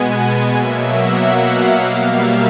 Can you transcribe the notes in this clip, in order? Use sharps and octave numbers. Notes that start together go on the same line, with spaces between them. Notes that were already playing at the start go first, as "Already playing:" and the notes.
Already playing: B2 G#3 B3 G#5
B2 F#3 A#3 E5
F#5
F5
F#5
B2 G3 A#3 F5
E5